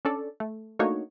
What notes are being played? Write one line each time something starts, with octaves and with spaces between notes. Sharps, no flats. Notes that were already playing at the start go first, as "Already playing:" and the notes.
C#4 D4 A4 D5
A3
A3 A#3 D4 D#4 F#4 C#5